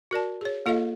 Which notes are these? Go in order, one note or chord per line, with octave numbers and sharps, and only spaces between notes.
F#4 A#4 D5 A5
G#4 C#5
A#3 F4 A4 D#5 F5